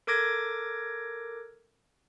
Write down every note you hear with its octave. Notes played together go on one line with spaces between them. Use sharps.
A4 A#4 D6 G#6 A#6 D7